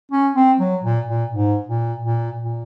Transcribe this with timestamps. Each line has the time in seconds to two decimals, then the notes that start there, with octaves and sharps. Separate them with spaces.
0.11 C#4
0.35 C4
0.60 F#3
0.83 A#2
1.08 A#2
1.32 G#2
1.69 A#2
2.05 A#2
2.41 A#2